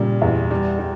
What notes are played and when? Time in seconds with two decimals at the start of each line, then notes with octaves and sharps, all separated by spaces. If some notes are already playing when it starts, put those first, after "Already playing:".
Already playing: A#2 C#3 G3
0.22 E2
0.51 G3
0.79 G3